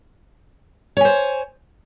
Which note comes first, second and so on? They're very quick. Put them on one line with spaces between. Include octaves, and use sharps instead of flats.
C#5 G#5 C5